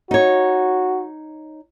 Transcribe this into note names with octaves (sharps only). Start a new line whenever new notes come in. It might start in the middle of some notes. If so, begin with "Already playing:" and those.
D#4 F#4 C#5